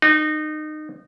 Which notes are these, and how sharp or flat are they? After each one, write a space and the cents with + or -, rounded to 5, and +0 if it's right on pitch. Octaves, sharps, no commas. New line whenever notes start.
D#4 -25